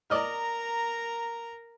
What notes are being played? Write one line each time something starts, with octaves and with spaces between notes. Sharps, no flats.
A#4 D5 D#5 A#5 F6